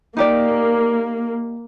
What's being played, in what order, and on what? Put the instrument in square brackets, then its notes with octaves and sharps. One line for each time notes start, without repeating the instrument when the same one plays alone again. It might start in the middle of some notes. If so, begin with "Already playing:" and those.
[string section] A#3 [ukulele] D#4 G4 D5